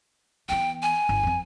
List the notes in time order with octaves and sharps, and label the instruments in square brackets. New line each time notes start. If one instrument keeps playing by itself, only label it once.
[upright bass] E3 B3 [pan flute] G5
[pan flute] G#5
[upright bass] G1
F2 C4